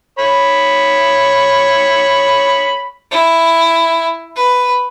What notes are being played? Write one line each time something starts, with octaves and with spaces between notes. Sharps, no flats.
C#5 B5
E4
B4